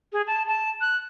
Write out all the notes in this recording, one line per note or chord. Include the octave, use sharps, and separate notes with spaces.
G#4
A5
A5
F#6